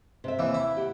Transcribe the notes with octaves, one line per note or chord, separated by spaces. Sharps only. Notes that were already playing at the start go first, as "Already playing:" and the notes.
C3 E5
D#2 E3
E4
G4 F#5